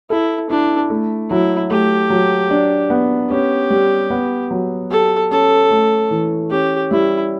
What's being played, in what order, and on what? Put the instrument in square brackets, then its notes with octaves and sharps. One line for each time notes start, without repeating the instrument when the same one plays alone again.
[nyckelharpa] E4 [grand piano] A4
[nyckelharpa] D4 [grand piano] E4
[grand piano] A3
[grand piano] F#3 [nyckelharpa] E4
[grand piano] A3 [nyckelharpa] G4
[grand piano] F#3
D4
B3
[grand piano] C#4 [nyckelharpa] G4
[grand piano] G3
B3
F#3
[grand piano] G4 [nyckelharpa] A4
[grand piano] C#4 [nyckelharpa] A4
[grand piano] A3
E3
[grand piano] C#4 [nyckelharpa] G4
[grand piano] G3 [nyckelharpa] E4